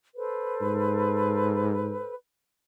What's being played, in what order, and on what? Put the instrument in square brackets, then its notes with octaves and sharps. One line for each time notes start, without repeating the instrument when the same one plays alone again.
[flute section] A4 B4 C5
[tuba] G#2